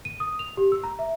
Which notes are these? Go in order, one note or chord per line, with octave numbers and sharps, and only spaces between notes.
D#7
D#6
F7
G4
E6
A#5
E5